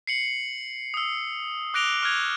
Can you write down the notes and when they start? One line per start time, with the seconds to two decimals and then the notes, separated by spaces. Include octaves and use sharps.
0.07 C7 C#7 F#7
0.94 D#6 E6
1.74 D6 F#6 A#6 D7 F7 G7
2.02 C#6 F6 F#6 G#6 F7